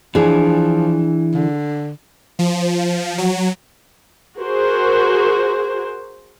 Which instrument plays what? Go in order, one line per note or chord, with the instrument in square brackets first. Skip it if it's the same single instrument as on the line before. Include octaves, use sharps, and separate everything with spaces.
[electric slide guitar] E3 [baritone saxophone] F3 [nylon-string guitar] D4 G#4
[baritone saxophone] D3
[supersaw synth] F3
F#3
[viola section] F#4 G#4 A#4 C5